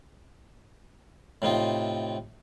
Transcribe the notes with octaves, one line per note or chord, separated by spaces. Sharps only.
A2 C3 D#4 F4